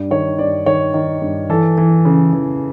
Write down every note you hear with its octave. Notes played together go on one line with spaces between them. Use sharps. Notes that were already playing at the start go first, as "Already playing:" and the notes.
Already playing: G2
D#3 C#5
G2 D5
D#3 C#5
D#3
G2
E3 A4
E3
C#3
E3